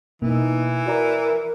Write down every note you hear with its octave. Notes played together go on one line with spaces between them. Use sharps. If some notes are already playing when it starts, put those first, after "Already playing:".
B2 E3 A#3 D#4
F#4 A#4 D5 A#5